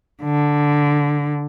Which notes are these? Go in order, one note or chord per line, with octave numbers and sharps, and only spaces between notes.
D3